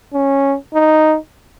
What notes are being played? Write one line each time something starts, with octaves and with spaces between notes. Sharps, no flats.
C#4
D#4